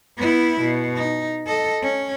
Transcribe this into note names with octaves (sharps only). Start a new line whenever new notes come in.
B3 E4
B2
D#4
A4 D#5
C#4